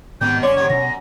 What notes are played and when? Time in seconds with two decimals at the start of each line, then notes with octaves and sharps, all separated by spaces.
0.21 G#2 B2 D#3 G3 B3 C4 G6
0.43 F#1 C#3 C#4 C#5 D5 C6
0.57 C3 D#3 F#3 G#6
0.70 F#2 B2 D4 A#6